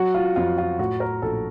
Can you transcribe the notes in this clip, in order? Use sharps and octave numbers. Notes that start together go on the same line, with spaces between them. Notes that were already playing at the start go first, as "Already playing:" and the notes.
Already playing: F#3 F#4
F4
F2 F4
F4
A2 F#4
A#4
A#1 A4